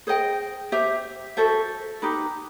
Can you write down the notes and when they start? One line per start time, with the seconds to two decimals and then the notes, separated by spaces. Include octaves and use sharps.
0.07 G#4 C5 D#5 G5
0.72 G4 C5 E5
1.37 F#4 A4 C5 E5
2.02 D#4 G4 B4